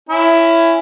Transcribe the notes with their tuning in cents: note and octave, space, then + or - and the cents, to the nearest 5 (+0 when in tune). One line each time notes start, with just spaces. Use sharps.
C#4 +0 E4 +15